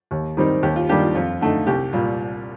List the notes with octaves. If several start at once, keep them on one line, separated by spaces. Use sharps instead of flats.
D#2
D#3 G3 C4 D#4
D#2 G4
F4
D#3 G3 A#3 D4 G4
F4
F2 F4
D3 A3 D#4
C2 G4
A#2 G3